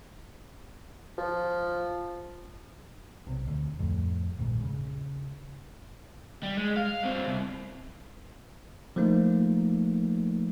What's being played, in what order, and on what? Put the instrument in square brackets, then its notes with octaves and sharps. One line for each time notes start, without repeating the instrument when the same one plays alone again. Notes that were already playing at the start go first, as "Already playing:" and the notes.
[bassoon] F3
[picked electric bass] B1 C3
D2
F2 A2
D#1 A#1 G#2
C#3
[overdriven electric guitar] G3
G#3
F5
G2 C4
C2
[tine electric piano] F3 A3 A#3 D#4